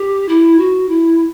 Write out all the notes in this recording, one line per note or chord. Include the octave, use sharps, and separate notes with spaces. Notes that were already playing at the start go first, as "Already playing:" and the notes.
Already playing: G4
E4
F#4
E4